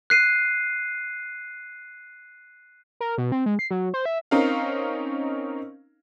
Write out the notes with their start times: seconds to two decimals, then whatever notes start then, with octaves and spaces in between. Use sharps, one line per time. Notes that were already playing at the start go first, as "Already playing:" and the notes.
0.10 F#6 C7 D#7
3.01 A#4
3.18 B2
3.32 C4
3.46 G#3
3.59 C7
3.71 F#3
3.94 C5
4.06 E5
4.31 C4 C#4 D#4 A#4 F5